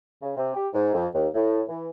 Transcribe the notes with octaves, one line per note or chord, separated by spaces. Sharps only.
C#3
C3
G4
G#2
F2
D#2
A2
E3